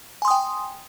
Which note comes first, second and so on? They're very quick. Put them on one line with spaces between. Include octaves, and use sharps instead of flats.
G#5 C6 D#6 G5